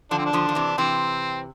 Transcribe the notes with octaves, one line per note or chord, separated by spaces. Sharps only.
D3 F3 D4
C4
D4
D3 F3
F3
C3 E3
C3 E3 C4